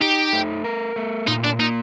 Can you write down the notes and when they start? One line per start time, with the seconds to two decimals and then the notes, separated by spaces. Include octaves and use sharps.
0.01 D#4 G4
0.33 A3
0.64 A#4
0.96 A3
1.27 A#2 D#4
1.44 D4
1.59 A#3 D#4